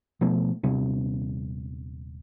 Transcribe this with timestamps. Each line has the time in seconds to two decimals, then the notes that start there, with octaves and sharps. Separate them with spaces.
0.21 B2 F3 A3
0.63 D#1 C3 G3